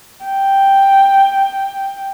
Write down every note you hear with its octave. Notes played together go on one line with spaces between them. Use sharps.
G5